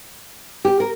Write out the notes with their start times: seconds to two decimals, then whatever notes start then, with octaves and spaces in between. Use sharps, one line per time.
0.65 G4
0.80 A#4